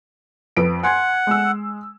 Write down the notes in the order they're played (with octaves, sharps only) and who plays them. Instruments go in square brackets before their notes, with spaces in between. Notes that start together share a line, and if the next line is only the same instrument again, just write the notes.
[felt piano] F2 B4 D7
[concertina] F#5 [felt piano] G#5 C6 G#6
[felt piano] G#3 E6